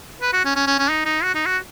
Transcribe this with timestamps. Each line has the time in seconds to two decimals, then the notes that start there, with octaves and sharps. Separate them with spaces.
0.22 B4
0.33 F#4
0.45 C#4
0.56 C#4
0.67 C#4
0.79 C#4
0.90 D#4
1.06 D#4
1.23 F#4
1.35 D#4
1.46 F#4